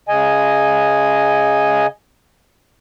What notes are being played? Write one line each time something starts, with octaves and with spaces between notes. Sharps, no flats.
C#3 D#5 G#5